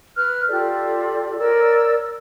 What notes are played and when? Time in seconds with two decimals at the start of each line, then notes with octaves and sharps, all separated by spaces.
0.16 B4 F6 F#6
0.49 F4 G4 A4 D5
1.38 A#4 C#5 D5 E6